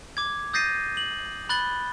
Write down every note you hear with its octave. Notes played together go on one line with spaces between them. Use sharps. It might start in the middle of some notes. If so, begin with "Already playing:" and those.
D6 G#6
D#6 G6 A6 A#6 C7 D#7
F#7
B5 F#6 A6 G7